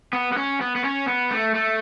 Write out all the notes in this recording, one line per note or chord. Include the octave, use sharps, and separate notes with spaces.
B3
B3
C#4
B3
B3
C#4
B3
A3
A3